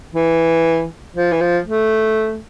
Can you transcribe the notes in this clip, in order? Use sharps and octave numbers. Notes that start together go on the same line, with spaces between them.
E3
F3
E3
F3
A3